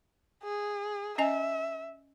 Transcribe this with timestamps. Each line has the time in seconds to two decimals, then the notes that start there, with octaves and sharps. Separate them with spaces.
0.43 G#4
1.18 C#4 D#5 E5 G#5